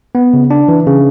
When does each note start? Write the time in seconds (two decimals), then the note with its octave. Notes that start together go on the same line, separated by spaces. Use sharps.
0.15 B3
0.34 C#3
0.50 D4
0.68 E3
0.87 C#3